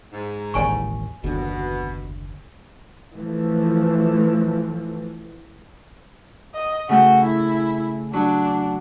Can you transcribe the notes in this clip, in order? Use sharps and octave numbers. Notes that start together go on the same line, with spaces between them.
G#2
E1 A1 D#2 C#5 G#5 C#6
F#1 D#2 B2 D3
E3 F3 A3
D#5
C#3 A3 F#4 G6
E4
F#3 D4